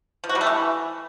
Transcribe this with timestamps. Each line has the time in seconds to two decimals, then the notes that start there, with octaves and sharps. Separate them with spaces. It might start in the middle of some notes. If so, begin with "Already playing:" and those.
0.24 F3
0.29 F#4
0.35 G3
0.41 A3
0.47 E3